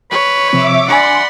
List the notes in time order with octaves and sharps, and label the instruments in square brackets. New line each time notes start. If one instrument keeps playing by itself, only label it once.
[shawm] B4 [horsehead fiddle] C#5
[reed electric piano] C3 F3 C4 [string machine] E5 D6
[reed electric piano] D4 G#5 [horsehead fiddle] D5 B5 [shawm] F#5 [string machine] C6